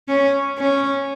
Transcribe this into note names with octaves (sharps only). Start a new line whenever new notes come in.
C#4
C#4